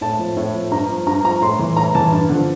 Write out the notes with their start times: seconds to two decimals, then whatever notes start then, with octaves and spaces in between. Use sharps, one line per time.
0.01 A2 A5
0.19 F3
0.37 A2
0.54 F3
0.71 G2 A#5
0.89 F3
1.07 G2 A#5
1.24 F3 A#5
1.41 A2 C6
1.59 E3
1.77 A2 A#5
1.95 E3 A5
2.12 G2
2.29 D3 F3